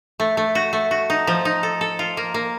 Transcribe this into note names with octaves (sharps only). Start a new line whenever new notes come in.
A3
A3
F#4
A3
F#4
D#4
F3
D#4
A4
A4
F4
A#3
A#3